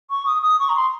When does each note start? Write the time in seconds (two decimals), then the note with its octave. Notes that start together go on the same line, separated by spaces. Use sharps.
0.10 C#6
0.26 D#6
0.42 D#6
0.59 C#6
0.69 A#5
0.76 C6